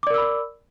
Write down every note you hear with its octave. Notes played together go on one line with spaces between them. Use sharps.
A#4 D5 B5 D6 E6